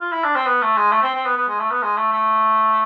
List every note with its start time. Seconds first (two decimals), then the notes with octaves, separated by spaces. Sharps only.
0.01 F4
0.12 E4
0.24 D4
0.36 C4
0.46 B3
0.62 A3
0.77 G#3
0.92 A3
1.03 C4
1.14 C4
1.26 B3
1.37 B3
1.49 G#3
1.59 A3
1.71 B3
1.82 G#3
1.97 A3
2.12 A3